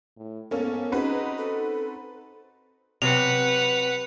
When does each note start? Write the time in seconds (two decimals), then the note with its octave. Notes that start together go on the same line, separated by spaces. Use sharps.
0.17 A2
0.51 G#2 A#3 B3 C#4 A4
0.92 C4 C#4 D#4 F#4 G#4 B4
1.38 A4
3.02 C3 F#3 C4 B4 F#5 F7